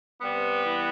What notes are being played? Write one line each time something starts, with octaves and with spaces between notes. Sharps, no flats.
C3 G3 B3
E3